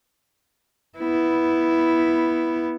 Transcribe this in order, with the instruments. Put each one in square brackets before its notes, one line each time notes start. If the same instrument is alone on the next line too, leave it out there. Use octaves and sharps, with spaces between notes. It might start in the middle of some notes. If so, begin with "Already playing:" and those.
[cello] B3 E4